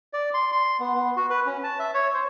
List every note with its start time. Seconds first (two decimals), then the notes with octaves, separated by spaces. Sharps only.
0.13 D5
0.34 C6
0.52 C6
0.80 B3
0.95 B3
1.17 F#4
1.30 B4
1.46 C#4
1.64 A5
1.79 E5
1.94 C#5
2.14 C5